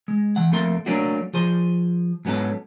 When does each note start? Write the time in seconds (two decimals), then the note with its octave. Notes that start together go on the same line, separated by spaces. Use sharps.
0.08 G#3
0.36 E3 F#5
0.52 F2 A3 A#3 C6
0.86 F#3 A3 A#3 C#4 D4 F#4
1.34 F3 G#4 C5
2.25 G#2 F#3 B3 C#4 A4